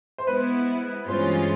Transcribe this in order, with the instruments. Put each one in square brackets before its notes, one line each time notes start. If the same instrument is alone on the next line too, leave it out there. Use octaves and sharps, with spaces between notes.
[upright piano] C5
[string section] G#3 B3 E4 [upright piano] B4
[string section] G2 E3 G#3 C#4 F4 [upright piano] C5